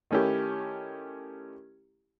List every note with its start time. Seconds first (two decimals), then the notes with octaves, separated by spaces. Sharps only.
0.11 D#3 A3 C#4 E4 G4